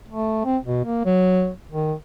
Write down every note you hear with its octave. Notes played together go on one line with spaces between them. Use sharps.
A3
C4
B2
A#3
F#3
D#3